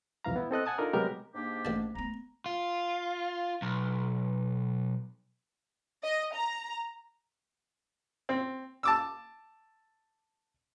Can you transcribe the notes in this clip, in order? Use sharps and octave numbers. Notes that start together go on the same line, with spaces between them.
C2 F2 E3 F5 A#5
B3 E4
C4 A4 D#5 F#6
F#5 G#5 A5 D#6
D4 D#4 F4 A4 A#4 D5
C3 F#3 G#3 B3 G4 A#4
G#2 A#3 D4 G4
A1 D5 A5
A3 B3 A#5
F4
B1
D#5
A#5
C4
A5 D6 E6